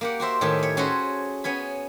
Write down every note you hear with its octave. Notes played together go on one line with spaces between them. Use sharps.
A#3 G4 F#5
F#4 G4 C5 E5
A2 D#3 A3 G4 G#5
C#5 B5
C#4 F#4 G#4 A4 B4 C5
B3 C#4 G#5 B5